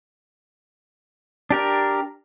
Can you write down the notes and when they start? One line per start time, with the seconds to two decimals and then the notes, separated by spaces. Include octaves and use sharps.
1.51 D4 G4 A#4